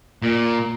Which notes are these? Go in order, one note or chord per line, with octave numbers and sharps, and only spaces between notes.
A#2